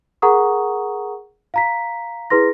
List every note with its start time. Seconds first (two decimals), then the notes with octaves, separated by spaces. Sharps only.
0.22 G#4 A#4 F#5 A#5 C#6 D#6
1.54 F5 A#5 B6
2.30 E4 G#4 B4 C6 A#6